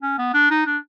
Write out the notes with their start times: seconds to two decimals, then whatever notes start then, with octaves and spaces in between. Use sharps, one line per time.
0.02 C#4
0.18 B3
0.34 D4
0.51 D#4
0.66 D4